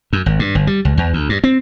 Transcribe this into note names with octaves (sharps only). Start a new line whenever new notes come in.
F#2
G#1
G2
G1
G3
C#2
E2
D2
G2
C4